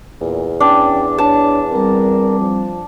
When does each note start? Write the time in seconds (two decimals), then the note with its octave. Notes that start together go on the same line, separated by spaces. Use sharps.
0.21 E2 A#2
0.60 C#4 D4 G5
1.18 D4 C#5 A5
1.72 G3 C4 A#4
2.40 F3